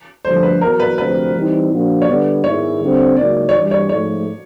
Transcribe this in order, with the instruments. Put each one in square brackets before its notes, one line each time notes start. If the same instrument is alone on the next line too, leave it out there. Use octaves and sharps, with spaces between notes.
[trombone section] G2 D3 F3 A3 [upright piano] C5
[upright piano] B4
[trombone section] E2 B2 F#3 B3 [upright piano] A#4
[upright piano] B4
[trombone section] D2 C3 F3 A3 C4 [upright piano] B4
[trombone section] E3 G3 C4 D#4
A#2 F3 A#3 D4 F#4
[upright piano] C#5
[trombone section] D3 G3 B3 [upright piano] D5
[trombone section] G#2 D#3 G#3 B3 E4 [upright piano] C#5
[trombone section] D3 G3 C4
[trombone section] C#2 C#3 F#3 A#3 D#4 [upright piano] D5
[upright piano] C#5
[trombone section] G2 E3 G3 [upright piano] D5
[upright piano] C#5
[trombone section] G#2 F3 A3 [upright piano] C#5